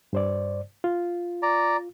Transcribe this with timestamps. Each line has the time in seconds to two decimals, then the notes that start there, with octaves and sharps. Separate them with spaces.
0.13 G2 C5 D5
0.84 F4
1.43 D5 A#5